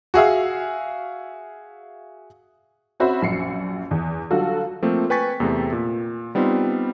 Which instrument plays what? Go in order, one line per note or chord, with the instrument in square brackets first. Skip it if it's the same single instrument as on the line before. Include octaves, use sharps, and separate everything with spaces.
[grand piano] F#4 G#4 E5 F5
[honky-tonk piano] C4 C#4 F#4 C5 E5 B5
A#1 F#2 C7 C#7
E2
D3 F#3 G3 F4 F#4 A4
[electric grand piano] F3 A3 A#3 C4
B4 G5 G#5 C#6 A6 B6
E2 C3 A3 C4
A#2
G3 B3 C4 D#4 F4